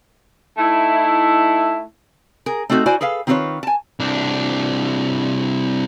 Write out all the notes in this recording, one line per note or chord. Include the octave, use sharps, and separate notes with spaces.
A3 D#4 E4
G#4 A#4
A3 C4 D#4 F#4 A4
E4 F#4 C5 D5 G#5
G#4 A4 B4 F5
D#3 C4 F4 A4 B4 C#5
G#5 A5
C2 D4